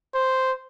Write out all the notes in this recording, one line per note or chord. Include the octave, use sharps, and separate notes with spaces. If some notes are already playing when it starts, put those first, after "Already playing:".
C5